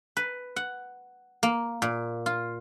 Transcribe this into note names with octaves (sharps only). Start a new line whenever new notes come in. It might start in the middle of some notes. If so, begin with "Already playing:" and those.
B4
F#5
A#3
A#2
F4